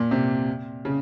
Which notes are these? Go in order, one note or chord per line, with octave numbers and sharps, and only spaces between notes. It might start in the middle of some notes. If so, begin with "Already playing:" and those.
Already playing: A#2
C3
C#3